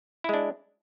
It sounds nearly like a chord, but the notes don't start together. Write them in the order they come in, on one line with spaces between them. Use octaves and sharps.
E4 G#3 D4